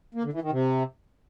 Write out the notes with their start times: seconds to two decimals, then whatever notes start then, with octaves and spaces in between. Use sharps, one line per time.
0.15 A#3
0.24 D3
0.33 E3
0.42 D#3
0.51 C3